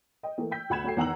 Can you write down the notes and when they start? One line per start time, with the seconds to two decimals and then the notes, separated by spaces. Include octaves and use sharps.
0.23 D#5 G5
0.38 E3 A3 A#3
0.51 G5 E6 G6 B6
0.70 D2 F#5 B5 G#6 E7
0.84 F#3 A3 F#4 G5 C7
0.97 E2 D#3 F#5 A#5 E6 F#7